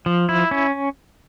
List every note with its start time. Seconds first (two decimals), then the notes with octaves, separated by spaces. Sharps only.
0.06 F3
0.29 E4
0.51 C#4